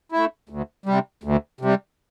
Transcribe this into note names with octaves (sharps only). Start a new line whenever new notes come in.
A3 E4
D2
C3 G3
D2
C3 G3